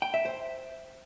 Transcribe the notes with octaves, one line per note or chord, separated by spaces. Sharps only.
G5
E5
C5